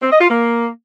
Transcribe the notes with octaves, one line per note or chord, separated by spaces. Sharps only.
C4
D#5
F4
A#3